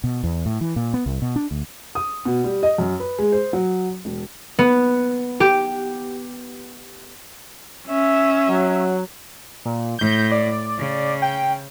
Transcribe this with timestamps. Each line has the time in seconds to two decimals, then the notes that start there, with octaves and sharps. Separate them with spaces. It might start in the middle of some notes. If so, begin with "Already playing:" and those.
0.04 B2
0.23 E2
0.46 A2
0.61 E3
0.76 A#2
0.94 B3
1.06 C2
1.22 B2
1.36 D4
1.51 D2
1.95 D#6
2.25 B2
2.44 G3
2.63 D#5
2.78 F#2
3.00 B4
3.18 G#3
3.32 C5
3.53 F#3
4.05 E1
4.59 B3
5.40 G4
7.88 C#4 E5
8.48 F#3
9.65 A#2
9.99 A2 G6
10.31 D5
10.78 C#3
11.22 G5